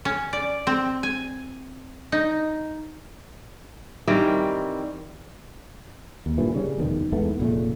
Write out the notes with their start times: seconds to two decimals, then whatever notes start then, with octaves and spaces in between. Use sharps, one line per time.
0.05 C#4
0.33 D5
0.67 C4
1.03 G#5
2.12 D#4
4.07 D#3 E3 G3 C4
6.26 D#2
6.38 G2 A#2 E3
6.54 C#3 G3 A#3 C#4
6.78 F1 E2 B2 D#3
7.12 E2 G#2 A3 B3
7.40 F1 A#2 C#3 A3